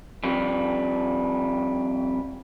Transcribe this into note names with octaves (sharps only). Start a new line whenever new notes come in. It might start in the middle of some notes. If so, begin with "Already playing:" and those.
F2 G3